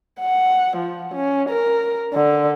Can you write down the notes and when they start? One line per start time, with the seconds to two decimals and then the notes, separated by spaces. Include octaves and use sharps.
0.20 F#5
0.77 F3
1.15 C#4
1.49 A#4
2.13 D3